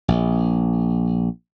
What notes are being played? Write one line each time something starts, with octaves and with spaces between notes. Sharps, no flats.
A#1